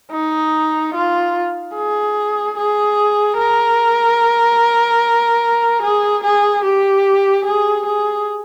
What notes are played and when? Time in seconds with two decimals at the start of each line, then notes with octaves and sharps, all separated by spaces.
0.12 D#4
0.94 F4
1.76 G#4
2.58 G#4
3.38 A#4
5.82 G#4
6.23 G#4
6.64 G4
7.45 G#4
7.86 G#4